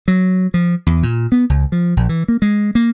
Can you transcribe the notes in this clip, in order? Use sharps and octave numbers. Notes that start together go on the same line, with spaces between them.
F#3
F3
E2
A#2
B3
C#2
F3
A#1
E3
A#3
G#3
A#3